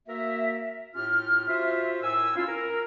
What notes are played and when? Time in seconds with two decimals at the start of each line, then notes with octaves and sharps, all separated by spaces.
0.08 A#3 F#4 A#4 E5
0.94 A2 C#4 F4 G4 F6
1.48 F4 F#4 C5 E5
2.02 A2 A#4 G#5 E6
2.35 C#4 E4 F4
2.47 A#4